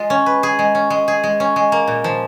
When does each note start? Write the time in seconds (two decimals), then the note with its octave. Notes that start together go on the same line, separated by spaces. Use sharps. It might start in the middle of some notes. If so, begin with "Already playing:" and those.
Already playing: G#3 F4
0.10 C#4
0.26 B4
0.43 G#4
0.59 G#3
0.75 C#4
0.90 G#3
1.08 G#4
1.24 G#3
1.40 C#4
1.56 G#3
1.72 A#3
1.87 A#2
2.04 F3